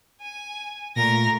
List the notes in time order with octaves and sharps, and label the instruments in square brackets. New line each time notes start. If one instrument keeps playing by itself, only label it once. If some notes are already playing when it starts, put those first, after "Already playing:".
[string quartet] G#5
[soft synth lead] A#2 [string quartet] A3 A#4 A#6